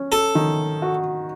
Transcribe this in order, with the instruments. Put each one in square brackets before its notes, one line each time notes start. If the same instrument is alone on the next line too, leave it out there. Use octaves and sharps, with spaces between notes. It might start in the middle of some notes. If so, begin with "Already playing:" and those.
Already playing: [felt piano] C#4
[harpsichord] A4
[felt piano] D#3
F#4